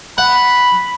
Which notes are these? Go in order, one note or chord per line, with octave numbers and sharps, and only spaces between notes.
F#5 B5